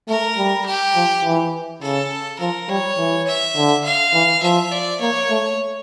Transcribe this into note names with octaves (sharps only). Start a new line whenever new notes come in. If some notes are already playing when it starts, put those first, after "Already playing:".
A3 A#4
G3
G4
F3
E3
C#3 A4
F3 A#4
G3 C#5
E3
E5
D3
F5
E3
F3 E5
D5
A#3 C#5
A3